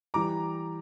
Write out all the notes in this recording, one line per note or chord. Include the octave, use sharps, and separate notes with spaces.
E3 G3 A#5 D6